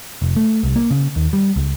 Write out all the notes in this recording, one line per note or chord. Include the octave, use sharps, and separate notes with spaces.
F1
A3
C2
A#3
C#3
D#2
G3
C#2